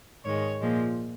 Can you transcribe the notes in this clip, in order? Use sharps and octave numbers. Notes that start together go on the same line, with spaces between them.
G#2 D#3 G#3 C#5
A#2 F3 G#3